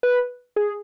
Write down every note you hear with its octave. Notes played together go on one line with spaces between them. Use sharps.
B4
G#4